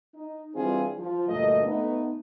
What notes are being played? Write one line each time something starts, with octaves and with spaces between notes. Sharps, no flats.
D#4
E3 G3 C4 D4 F4 G#4
F3
D2 G2 A#2 A3 D#5
A3 B3 D#4